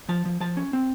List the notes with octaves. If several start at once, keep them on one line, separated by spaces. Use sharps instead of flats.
F3 A5
F3
F3 A5
C#4
C4